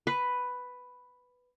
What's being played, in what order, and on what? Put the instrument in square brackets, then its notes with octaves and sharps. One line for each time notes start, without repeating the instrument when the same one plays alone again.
[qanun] B4